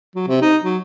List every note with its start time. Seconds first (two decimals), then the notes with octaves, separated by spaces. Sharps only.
0.16 F#3
0.28 C3
0.42 D#4
0.64 F#3